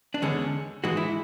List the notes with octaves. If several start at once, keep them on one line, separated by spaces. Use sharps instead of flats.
D4
E2 D3 G#3 C#4
G#2 E3 G#3 F#4
E4